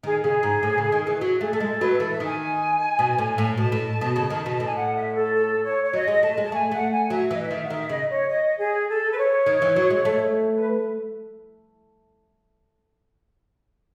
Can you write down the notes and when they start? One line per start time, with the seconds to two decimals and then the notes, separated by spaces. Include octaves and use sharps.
0.03 D#3 G#4
0.24 C#3 G#4
0.43 G#2
0.63 A2
0.78 C#3
0.92 D#3
1.07 E3
1.21 F#3
1.39 A3 G#4
1.52 A3 A4
1.60 G#3
1.80 F#3 B4
1.95 A4
2.00 E3
2.10 E5
2.20 D#3 G#5
2.99 B2
3.18 A2
3.38 A2
3.57 B2 A5
3.72 A2
4.01 B2
4.16 C#3
4.30 D#3
4.46 B2
4.54 A5
4.60 A2 G#5
4.75 F#5
4.95 E5
5.15 A4
5.34 A4
5.63 C#5
5.83 C#5
5.93 F#3 D#5
6.08 G#3
6.22 A3 A5
6.38 G#3
6.43 A5
6.52 A3 G#5
6.71 A3 F#5
6.91 G#5
7.10 F#3 E5
7.31 E3 D#5
7.40 E5
7.51 D#3
7.65 F#5
7.70 D#3 E5
7.89 C#3 D#5
8.09 C#5
8.28 D#5
8.59 G#4
8.88 A4
9.11 B4
9.18 C#5
9.46 D#3
9.62 E3
9.76 F#3
9.90 G#3
10.05 A3
10.53 B4